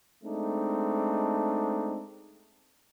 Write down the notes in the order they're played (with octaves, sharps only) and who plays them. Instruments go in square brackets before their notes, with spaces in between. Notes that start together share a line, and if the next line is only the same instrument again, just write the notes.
[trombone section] G#3 A3 C4 D4 D#4